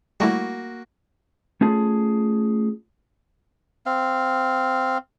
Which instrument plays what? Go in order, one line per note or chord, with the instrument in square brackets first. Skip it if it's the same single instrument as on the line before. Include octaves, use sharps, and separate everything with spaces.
[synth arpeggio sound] G3 A3 E4 [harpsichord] A#3 F#4
[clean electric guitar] A3 C#4 F4 G#4 A5
[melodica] C4 F5